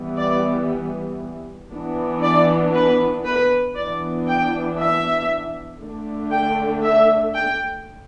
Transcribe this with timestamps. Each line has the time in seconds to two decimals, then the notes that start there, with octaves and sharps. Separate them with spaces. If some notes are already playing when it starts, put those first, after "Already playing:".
Already playing: E3 G3 B3
0.18 D5
1.71 E3 B3 D4
2.22 D5
2.73 B4
3.25 B4
3.75 E3 B3 D4 D5
4.26 G5
4.78 E5
5.80 D3 A3 D4
6.31 G5
6.83 E5
7.34 G5